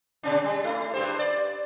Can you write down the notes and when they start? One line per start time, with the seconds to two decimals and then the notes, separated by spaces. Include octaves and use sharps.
0.23 B2 C#4 D4
0.44 G3
0.64 A3 E4
0.94 G2 G4 C5
1.19 D5